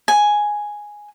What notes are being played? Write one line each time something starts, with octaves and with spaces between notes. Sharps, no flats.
G#5